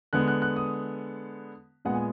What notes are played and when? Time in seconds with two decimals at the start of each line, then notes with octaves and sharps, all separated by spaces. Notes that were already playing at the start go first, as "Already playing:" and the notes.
0.13 D3 G#3 B3 F#6
0.28 F#6
0.42 F#6
0.56 D#6
1.85 A#2 G#3 B3 F#5
1.95 G#5